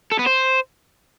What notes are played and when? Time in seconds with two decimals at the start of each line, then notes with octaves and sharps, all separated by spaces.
0.12 A4
0.19 B3
0.26 C5